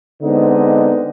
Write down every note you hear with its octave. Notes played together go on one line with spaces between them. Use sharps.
D3 G#3 B3 C4 D#4